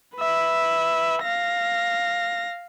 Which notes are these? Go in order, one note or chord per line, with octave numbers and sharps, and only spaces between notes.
B4 E5
F5 A#6